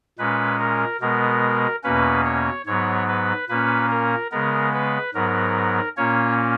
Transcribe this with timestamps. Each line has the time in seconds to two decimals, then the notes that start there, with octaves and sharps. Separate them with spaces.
0.18 A#2 G#3 C#4 B4
0.59 A#4
1.01 B2 G#3 B3 A#4
1.84 E2 B2 A#3 C#4 B4
2.25 C#5
2.66 G#2 F#3 B3 C#5
3.08 B4
3.49 A#2 A#3 C#4 B4
3.90 A#4
4.31 C#3 G#3 B3 A#4
4.73 B4
5.14 G#2 F#3 B3 A#4
5.97 A#2 A#3 C#4 C#5